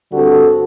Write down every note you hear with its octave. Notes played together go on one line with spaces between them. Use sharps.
G2 D3 G3 C4 F#4 A4